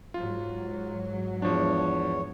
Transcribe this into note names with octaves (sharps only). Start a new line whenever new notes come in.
G#2 F#3 F4
E2 F3 D4 C#5